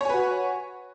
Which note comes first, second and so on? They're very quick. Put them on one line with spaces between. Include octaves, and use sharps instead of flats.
C#5 G#5 B4 F#4